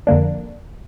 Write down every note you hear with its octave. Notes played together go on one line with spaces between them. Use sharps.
F2 D3 A#3 D4